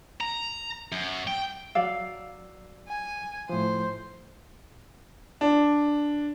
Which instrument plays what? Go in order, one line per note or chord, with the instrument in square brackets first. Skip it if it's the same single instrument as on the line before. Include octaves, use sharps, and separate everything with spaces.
[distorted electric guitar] A#5
F#2
G5
[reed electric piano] F#3 D5 E6 [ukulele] F5
[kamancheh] G#5
[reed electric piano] A2 F3 [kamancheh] C5
[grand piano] D4